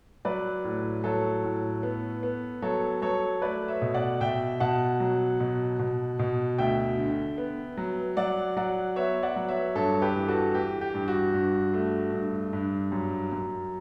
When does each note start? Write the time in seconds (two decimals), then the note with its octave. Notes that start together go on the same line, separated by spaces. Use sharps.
0.25 F#3 B4 D5
0.64 A2
1.04 F#3 A4 C#5
1.44 A2
1.83 B3
2.23 B3
2.62 F#3 A4 C#5
3.02 F#3 A4 C#5
3.42 A3 B4 D5
3.68 C#5 E5
3.82 B2
3.94 D5 F#5
4.21 B2 E5 G5
4.60 B2 F#5 A5
5.00 F#3
5.40 B2
5.79 B2
6.19 B2
6.58 D2 E5 G5
6.98 D3
7.38 B3
7.77 F#3
8.17 F#3 D5 F#5
8.57 F#3 D5 F#5
8.96 B3 C#5 E5
9.23 D5 F#5
9.36 F#3
9.49 C#5 E5
9.75 G2 A4 C#5
10.02 G4 B4
10.15 E3
10.28 F#4 A4
10.54 E3 G4
10.81 G4
10.94 G2
11.08 F#4
11.34 G2
11.74 A3
12.13 G2
12.53 G2
12.92 F#2
13.32 F#2